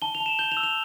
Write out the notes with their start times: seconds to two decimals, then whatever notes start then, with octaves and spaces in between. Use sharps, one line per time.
0.02 A5 G7
0.15 F7
0.20 A5
0.26 E7
0.39 G6 G7
0.52 F7
0.57 E6
0.63 F7